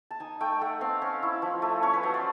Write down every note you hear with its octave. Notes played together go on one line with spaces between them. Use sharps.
A5
D#4 G#5
A3 G5
A3 F#5
C4 F5
C#4
E4
F3
A3
C#4 C#5
B4
F#3 C5
D5